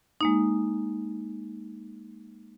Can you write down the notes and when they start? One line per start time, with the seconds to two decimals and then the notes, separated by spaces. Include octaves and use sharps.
0.21 G#3 A#3 D#4